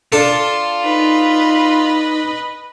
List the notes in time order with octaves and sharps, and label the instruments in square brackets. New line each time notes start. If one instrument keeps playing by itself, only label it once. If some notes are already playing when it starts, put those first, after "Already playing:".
[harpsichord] D4 A4 [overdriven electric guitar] F4
[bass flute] D#4 [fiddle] B4 D#5